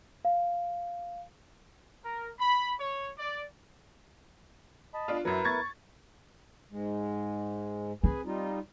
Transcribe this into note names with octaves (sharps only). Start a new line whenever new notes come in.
F5
A#4
B5
C#5
D5
D#5 A5 B5
D4 F4
F#2 F#3 E4 A#4 B4
C#6 G#6 A6
G#2 G#3
C4 G#4 B4 G#5
G3 D#4 F4